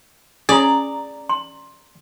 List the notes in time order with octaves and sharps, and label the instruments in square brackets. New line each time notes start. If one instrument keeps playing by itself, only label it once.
[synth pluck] C#4 A#5 [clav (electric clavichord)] G#4 [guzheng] D5
[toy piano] C6